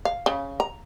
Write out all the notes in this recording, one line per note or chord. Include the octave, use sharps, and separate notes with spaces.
F5
C#3
A#5